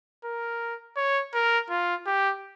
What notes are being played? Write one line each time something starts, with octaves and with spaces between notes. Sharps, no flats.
A#4
C#5
A#4
F4
G4